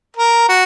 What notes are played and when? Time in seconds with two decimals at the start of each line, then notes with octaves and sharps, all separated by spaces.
0.17 A#4
0.49 F#4